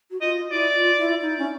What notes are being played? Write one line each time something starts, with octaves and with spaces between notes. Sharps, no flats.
F#4
F4 D#5
E4 D5
F4
E4
D#4
C#4